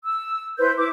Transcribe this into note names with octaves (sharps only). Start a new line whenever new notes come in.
E6
E4 B4 C5 G6
E4 D6